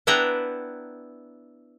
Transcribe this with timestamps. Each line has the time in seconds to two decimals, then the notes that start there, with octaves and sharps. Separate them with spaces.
0.07 B3 D4 E4 B4 G5 A#5